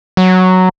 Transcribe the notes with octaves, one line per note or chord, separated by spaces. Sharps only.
F#3